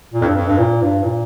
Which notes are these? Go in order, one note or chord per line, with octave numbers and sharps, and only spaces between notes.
A#2
F2
G2
F2
G2
A#2
G2
A#2